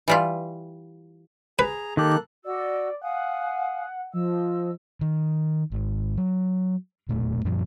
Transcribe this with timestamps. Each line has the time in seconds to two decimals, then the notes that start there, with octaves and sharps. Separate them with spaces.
0.08 E3 G3 F4
1.59 G#4 B4 A#5
1.97 D#3 A#3 G4 A4 F#6
2.44 F#4 D5 D#5 E6
3.02 F5 F#5 G#5 D#6
4.14 F3 D#5 E6
5.01 D#3
5.72 G#1
6.17 F#3
7.09 E1 A#2 A3
7.45 F#2 A#2 F3